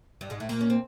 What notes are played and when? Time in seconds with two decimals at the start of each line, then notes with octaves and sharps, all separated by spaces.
0.21 G2 G3
0.30 G#2 G#3
0.40 A2 A3
0.49 A#2 A#3
0.61 C#4
0.70 C4